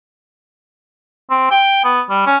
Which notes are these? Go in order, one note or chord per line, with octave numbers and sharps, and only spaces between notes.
C4
G5
B3
G3
C#4